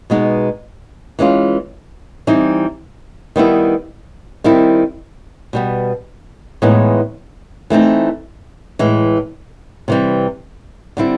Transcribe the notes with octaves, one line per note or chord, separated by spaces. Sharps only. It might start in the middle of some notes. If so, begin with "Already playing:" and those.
B2 G#3 B3 D#4
E3 G#3 C#4 F4
E3 G3 C4 D#4
D#3 G3 B3 E4
D#3 G3 C4 E4
B2 G3 B3
A2 E3 G#3 B3 D#4
E3 A3 C4 D#4
A2 E3 G#3
C3 E3 G3
D3 G3 C4 E4